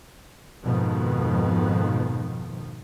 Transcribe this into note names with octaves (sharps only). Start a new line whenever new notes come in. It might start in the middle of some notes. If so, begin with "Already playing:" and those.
F2 G#2 B2 D#3 F3